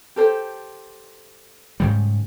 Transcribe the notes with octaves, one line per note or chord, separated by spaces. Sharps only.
G4 A4 C5
G#2 C#3 G3